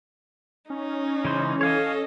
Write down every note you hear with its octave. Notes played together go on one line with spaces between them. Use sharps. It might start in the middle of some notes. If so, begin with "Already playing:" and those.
C#4 D#4
C#3 E3 G#3 C5
A4 C#5 D#5 F5 G#5